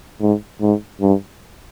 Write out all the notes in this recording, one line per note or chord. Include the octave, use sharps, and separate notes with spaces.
G#2
G#2
G2